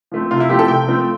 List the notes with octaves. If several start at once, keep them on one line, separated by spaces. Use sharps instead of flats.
F3 A3 C4
C3 F4
E4
F3 A3 C4 G4
A4
C3 G5
F3 A3 C4